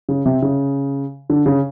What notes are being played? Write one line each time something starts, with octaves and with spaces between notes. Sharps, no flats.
C#3
C3
C#3
D3
C#3